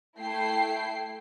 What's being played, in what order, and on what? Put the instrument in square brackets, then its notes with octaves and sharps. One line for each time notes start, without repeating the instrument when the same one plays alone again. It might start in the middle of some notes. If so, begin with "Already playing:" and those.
[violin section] A3 E4 G5 C7